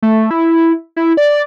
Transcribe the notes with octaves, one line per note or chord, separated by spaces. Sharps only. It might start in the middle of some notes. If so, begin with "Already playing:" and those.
A3
E4
E4
D5